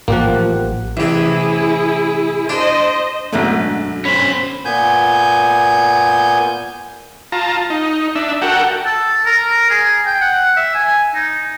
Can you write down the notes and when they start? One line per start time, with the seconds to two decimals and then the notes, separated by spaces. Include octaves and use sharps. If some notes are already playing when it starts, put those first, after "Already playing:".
0.08 A1 F3 A#3 G4 F#5
0.97 A1 C3 E4 G#4
2.49 D4 C5 D#5
3.32 G#1 F#2 B2 D3 A3
4.05 C#4 C5 B5
4.65 A#2 B3 G#5 G6
7.32 F4 A5 A#5
7.70 D#4
8.15 D4 E5
8.42 F#4 A4 A#4 F#5 G5
8.85 A4
9.26 A#4
9.70 G#4
10.06 G5
10.21 F#5
10.57 E5
10.75 G#5
11.15 D#4